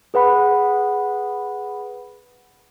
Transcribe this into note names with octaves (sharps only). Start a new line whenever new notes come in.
G#4 B4 F#5 B5